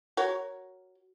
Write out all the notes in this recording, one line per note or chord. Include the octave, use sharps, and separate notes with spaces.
F#4 A#4 C#5